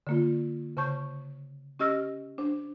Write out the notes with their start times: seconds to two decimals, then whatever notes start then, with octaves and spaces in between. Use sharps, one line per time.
0.07 D3 A#3 F4
0.77 C#3 C5 A5 C#6 G6
1.79 C#4 G4 D#5 E6 F6 A#6
2.38 D4 C5